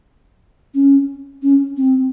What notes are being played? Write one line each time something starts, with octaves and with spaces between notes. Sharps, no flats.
C#4
C#4
C4